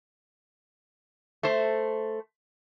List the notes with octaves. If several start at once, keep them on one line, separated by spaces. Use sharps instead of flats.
A3 C5